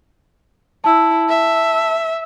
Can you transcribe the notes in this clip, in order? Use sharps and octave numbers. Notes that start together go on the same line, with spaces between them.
E4 A5 E6
E5